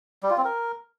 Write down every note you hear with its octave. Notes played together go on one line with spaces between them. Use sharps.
G3
F4
C4
A#4